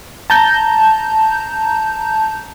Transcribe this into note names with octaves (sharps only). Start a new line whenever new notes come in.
A5 A#5 G6